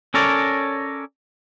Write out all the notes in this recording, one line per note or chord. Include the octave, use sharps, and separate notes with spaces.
C#4 A4 A#4 C#5 D5